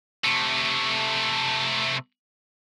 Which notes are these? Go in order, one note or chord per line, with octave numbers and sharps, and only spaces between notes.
C3 A3